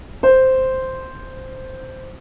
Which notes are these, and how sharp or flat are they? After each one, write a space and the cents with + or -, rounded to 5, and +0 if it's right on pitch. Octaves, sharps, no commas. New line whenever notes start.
C5 -5